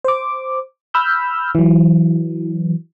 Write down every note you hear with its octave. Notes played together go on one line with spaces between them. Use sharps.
C5 D6
B5 E6 F6 G6
E3 F#3